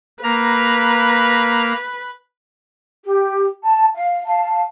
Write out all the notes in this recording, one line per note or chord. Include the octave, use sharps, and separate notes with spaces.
A#3 B4 A#5
G4
A5
F5
F5 A5